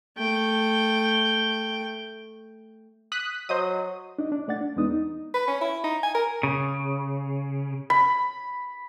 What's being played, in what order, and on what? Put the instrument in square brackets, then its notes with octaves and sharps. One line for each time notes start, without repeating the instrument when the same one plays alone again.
[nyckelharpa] A3 G5
[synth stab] D#6 F#6 B6
[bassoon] F#3 [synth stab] C5 D#5 D#6
[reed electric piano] D4 D#4 D#5
D4
A3 D5 F#5 A6
D4
E2 G#3 B3 D4 D#4 D#6
D#4
[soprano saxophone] B4
C#4
E4
D#4
G#5
A#4
[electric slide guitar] C#3
[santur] B5